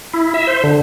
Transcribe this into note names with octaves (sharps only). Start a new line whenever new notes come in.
E4
E5
C5
D3